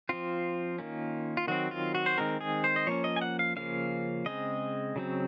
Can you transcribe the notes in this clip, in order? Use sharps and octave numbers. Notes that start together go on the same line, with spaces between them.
F3 C4 F4
D#3 A#3 C#4
F4
D#3 F#3 C4 F#4
F4
F#4
C5
D#3 G#3 C4 A#4
G#4
C5
D#5
F3 A#3 C#4 C#5
D#5
G#5
F#5
F5
C#3 F3 A#3 C#4 F5
C#3 G#3 C4 D#5
C#3 F#3 C4